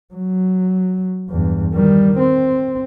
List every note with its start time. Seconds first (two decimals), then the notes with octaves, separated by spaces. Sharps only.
0.14 F#3
1.29 E2 G2
1.74 D#3 G3
2.19 C4